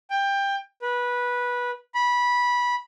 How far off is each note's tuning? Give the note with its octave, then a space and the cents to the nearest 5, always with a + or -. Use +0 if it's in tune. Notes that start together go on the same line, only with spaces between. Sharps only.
G5 +20
B4 -15
B5 -15